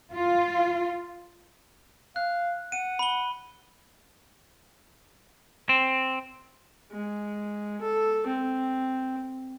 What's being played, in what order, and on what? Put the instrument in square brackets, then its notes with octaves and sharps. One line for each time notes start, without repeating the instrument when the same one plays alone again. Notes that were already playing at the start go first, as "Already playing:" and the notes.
[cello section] F4
[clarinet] F5 [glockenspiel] F#6
[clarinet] F#5 [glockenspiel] D#7
[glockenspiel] B5 G7
[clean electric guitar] C4
[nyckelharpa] G#3
A4
C4